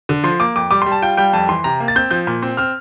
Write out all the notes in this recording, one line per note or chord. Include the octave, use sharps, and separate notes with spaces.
D3
F3 C6
A#3 D6
F2 D6
G3 D6
C6
G3
A5
F4 G5
G3 G5
F2 A5
E3 C6
C3 A#5
A#3
A6
C4 G6
F3 G6
A#2
C4
C4 F6